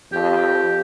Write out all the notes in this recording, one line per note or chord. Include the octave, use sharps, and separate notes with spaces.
F2 G4